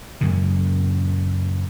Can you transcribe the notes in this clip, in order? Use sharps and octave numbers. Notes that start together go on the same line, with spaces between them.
F#2 A#2 C#3